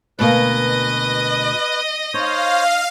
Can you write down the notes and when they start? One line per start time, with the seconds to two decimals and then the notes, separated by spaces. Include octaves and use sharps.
0.19 D2 B2 A#3 B4 D#5 A#6
2.14 D#4 C5 C#5 F5